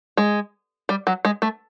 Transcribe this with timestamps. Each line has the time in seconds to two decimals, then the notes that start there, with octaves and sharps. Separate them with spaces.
0.17 G#3
0.89 G3
1.07 F#3
1.25 G#3
1.42 A3